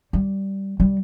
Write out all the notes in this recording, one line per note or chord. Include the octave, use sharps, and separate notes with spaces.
G3
G3